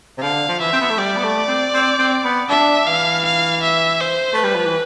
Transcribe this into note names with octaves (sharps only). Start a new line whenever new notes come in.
C3
D3 F5
F3
E3 E5
C4
B3
A3
G3 D5
B3
A3
C4
C4
C4
B3
D4 E5
E3 F5
F5
E5
C5
A3 B4
G3
F3
E3